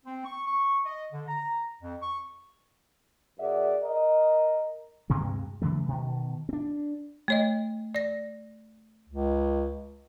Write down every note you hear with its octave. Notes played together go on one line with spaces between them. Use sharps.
C4
C#6
C#6
D#5
D3
A#5
F2
C#6
F#2 G#4 D5 E5 F#5
A#4 D#5
D2 G2 C3 G#3
C#3 E3 F#3 A3
B2 D#3
C4 D4
A3 C#5 D#5
D5 A#6
C#2